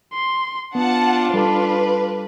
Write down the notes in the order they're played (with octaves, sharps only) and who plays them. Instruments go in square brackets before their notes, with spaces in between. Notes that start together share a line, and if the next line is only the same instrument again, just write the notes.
[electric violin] C6
[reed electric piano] B3 [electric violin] D4 F4 [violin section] F#5 A5
[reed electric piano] G3 A4 A5 [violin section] B4